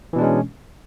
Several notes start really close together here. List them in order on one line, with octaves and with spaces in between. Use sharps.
E3 B2 D4 G#3 C#4